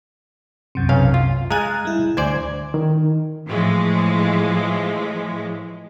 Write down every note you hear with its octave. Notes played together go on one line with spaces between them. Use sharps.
C2 F#2 C3
B1 C#4 F5
F4
G#3 F5 G#5 A#5 F#6 A6
G3 E4
D2 C5 D5 G#5 G#6
D#3
A2 E3 F3 G#3